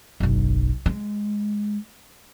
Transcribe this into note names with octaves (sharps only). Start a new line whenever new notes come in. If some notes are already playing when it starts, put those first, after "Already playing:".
F#1 B1
G#3